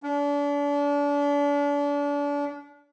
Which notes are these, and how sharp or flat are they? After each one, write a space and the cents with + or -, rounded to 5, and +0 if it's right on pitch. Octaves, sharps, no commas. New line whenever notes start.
D4 -35